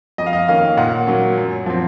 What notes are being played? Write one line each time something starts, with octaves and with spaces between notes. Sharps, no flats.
F2 D#5
F5
D#5
D#3 A#3 C#4 F5
A#2 F#5
F#3 A#3 C#4
F#2
F3 C4